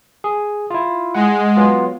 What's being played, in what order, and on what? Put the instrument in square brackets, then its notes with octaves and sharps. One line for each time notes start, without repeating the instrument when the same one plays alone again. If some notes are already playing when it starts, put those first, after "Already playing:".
[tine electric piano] G#4
E4 F4
[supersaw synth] G#3 [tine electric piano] F#5
[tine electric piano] F#3 B3 F4